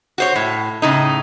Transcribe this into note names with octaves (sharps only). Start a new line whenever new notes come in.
F#4 C5 C#5
A2
A2 C#3 D#4